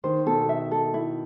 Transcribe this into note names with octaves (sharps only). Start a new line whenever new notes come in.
D#3 C5
B2 A4
E5
A4
E4